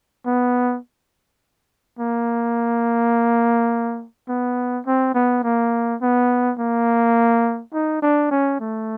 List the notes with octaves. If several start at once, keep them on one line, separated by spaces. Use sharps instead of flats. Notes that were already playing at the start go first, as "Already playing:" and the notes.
B3
A#3
B3
C4
B3
A#3
B3
A#3
D#4
D4
C#4
A3